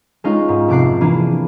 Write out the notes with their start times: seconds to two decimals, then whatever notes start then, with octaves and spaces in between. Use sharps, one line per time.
0.24 G#3 C#4 D#4 F4
0.48 G#2
0.68 F1 C3 D6 F#6 C7
1.01 E3 A#3 D4 G#4